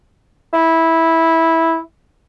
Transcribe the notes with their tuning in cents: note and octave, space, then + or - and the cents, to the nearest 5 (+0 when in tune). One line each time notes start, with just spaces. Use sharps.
E4 -10